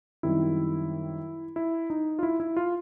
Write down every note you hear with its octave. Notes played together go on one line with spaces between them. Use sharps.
F#2 D#3 G3 C4 E4
E4
D#4
F4
E4
E4
F4